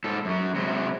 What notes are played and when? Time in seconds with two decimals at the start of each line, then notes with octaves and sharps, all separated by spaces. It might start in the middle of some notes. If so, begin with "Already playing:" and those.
0.04 G#2 A4
0.25 F#2 F#3
0.55 C3 F#3 G#3